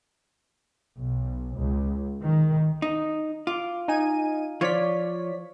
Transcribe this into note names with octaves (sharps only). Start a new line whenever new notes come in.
B1
C#2
D#3
D#4
F4 D6
D#4 G#5 D#7
F3 F4 C#5 D5 B6